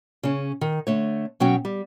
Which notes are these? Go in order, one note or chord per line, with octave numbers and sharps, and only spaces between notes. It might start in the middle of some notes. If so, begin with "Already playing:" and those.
C#3 C#4
D#3
D3 A3 C#5
B2 F#3 C#4 G5
G3